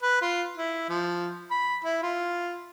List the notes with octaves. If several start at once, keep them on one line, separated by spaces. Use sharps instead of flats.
B4
F4
E4
F3
B5
E4
F4